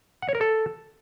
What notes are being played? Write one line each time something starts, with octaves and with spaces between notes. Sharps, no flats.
F#5
C#5
A#4
A4